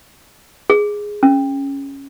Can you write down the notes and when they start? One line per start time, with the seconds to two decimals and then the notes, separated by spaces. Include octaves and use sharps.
0.70 G#4
1.23 C#4